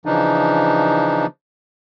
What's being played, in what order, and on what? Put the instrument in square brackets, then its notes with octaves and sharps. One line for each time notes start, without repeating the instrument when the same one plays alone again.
[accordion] C#3 E3 F3 D4 D#4